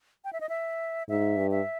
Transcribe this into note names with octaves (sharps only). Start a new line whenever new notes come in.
G5
E5
D#5
E5
G#2 E5
G2
E5